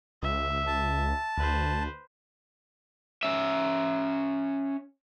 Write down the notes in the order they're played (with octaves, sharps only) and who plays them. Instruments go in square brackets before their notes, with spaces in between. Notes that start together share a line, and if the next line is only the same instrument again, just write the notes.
[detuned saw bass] C#2 [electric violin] E5
[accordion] A5
[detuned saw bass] D2 [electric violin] B4 C5
[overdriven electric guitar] C#4 E5